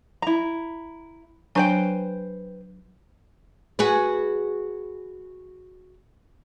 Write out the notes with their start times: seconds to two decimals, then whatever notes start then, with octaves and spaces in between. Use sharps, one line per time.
0.22 E4 A#5
1.55 F#3 D4 B4 C5 G5 G#5
3.79 F#4 G#4 B4